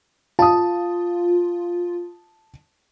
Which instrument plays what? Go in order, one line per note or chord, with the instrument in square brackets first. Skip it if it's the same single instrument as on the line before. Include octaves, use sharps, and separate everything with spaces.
[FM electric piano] F4 [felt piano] A5 D#6